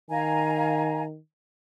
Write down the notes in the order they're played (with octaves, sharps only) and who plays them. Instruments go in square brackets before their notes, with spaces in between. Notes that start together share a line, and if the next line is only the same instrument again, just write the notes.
[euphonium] D#3 [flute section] F5 G#5 A#5